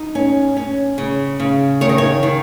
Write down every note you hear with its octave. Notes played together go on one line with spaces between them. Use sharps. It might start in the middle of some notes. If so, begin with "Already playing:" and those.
Already playing: D#4
C#4
C#4
C#3
C#3
D#3 C#5
D#5
C#5
D#3